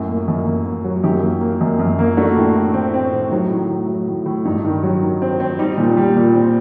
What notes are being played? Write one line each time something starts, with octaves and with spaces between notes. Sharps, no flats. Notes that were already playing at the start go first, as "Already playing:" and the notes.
Already playing: F#2 A2
A#3
F#2
A#3
A#3
F#3
F#2 D#4 G4
A#3
A#3
F#2
F#2
A#3
A3 D4 F#4
A2
A2
C4
C4
A2
F#3 D#4
A2
A2
F#3
A2
A2
G2 D#4
D#3
F#3
D#3
C4
C4
G3 D#4 G4
A#2
G3
A#2
C4